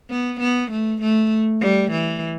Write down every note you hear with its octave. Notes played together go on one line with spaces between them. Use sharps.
B3
B3
A3
A3
G3
E3